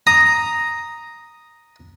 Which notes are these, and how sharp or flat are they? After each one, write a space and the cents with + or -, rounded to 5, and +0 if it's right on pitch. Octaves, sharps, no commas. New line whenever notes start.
A#5 +0 D#6 +0